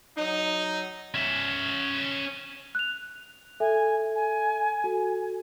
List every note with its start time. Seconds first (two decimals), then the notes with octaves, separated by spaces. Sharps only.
0.17 F#3 D#4
1.14 C#4 E5
2.75 F#6 F7
3.60 A4 E5 G#5
4.15 G#5
4.84 F#4 A4